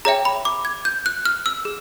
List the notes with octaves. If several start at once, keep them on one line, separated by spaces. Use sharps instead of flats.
G#4 C#5 E5 G5 A#5
B5
D6
G#6
G6
F#6
F6
E6
G#4